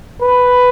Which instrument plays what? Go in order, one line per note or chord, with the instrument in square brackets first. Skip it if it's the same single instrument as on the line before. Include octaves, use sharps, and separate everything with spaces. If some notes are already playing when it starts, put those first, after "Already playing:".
[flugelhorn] B4